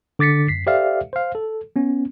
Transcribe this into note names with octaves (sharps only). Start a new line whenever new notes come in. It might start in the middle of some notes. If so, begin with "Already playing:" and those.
D3 D6 A6 B6 C#7
F#2 B6 C7
G4 A4 C5 D5 E5 F5
C5 F5
A4
B3 C#4